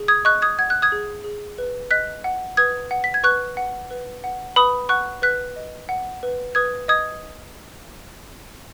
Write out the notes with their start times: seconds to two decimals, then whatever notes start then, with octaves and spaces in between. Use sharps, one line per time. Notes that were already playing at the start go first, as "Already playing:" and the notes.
Already playing: G#4
0.08 D#6 G#6
0.25 D#5 C#6 F#6
0.42 D#6 G#6
0.59 F#5 G#6
0.70 F#6
0.82 D#6 G#6
0.92 G#4
1.24 G#4
1.58 B4
1.91 D#5 F#6 B6
2.24 F#5
2.57 B4 D#6 G#6
2.91 F#5
3.04 B6
3.14 G#6
3.23 B4 C#6 F#6
3.57 F#5
3.91 B4
4.24 F#5
4.56 B4 B5 D#6
4.89 F#5 C#6 F#6
5.22 B4 F#6 B6
5.56 D#5
5.89 F#5
6.23 B4
6.55 B4 D#6 G#6
6.88 D#5 D#6 G#6